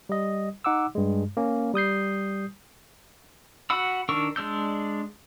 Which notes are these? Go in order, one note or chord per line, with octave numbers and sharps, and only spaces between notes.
G3 D#5
D#4 F#5 D6 E6
G2 G#3
A#3 C#4
G3 D#6 G6 C7
F#4 F#5 B5 E6
D#3 D4 A#4 C#6 E6
G#3 D4 E6 G6